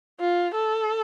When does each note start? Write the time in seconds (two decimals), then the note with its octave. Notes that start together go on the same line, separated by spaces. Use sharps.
0.20 F4
0.55 A4